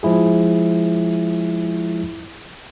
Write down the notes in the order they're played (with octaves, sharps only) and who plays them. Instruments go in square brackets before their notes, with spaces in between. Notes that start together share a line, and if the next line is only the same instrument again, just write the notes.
[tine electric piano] F3 G#3 E4 G#4